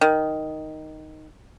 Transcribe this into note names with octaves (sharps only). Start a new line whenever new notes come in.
D#3